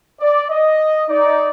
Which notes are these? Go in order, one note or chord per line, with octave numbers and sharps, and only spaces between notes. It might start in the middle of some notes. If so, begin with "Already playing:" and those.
D5
D#5
D#4 D5